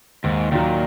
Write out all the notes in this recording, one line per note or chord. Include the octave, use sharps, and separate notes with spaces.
D#2 G#2
A#2 D#3 F#3